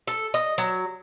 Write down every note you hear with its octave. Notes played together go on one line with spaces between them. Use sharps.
A4
D#5
F#3